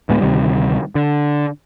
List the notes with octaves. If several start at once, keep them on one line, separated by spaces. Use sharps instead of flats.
D2 A2 G#3 B3
D2 C3 D#3 G3
D3